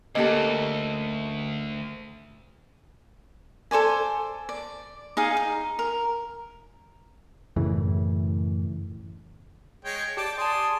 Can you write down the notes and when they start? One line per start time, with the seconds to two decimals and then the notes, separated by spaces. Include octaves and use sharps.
0.15 D2 A#3 C#4 G4 A4 D#5
3.71 A4 C5 D5 G#5
4.49 D5
5.17 D#4 G#4 F5
5.37 D#4
5.79 A#4
7.56 F#2 A2 C#3 E3
9.85 G#3 C#5 G5
10.17 G4 D5 G5 A5 D6 D7
10.38 G#4 D5 A5 C6 D#6